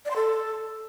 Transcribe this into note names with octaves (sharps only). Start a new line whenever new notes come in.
D5
C6
A4